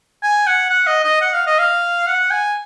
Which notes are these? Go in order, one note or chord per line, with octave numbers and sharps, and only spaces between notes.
G#5
F#5
F#5
D#5
D#5
F#5
F5
D#5
F5
F#5
G#5